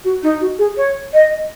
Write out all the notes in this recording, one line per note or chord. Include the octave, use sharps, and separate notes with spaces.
F#4
D#4
F#4
G#4
C#5
D#5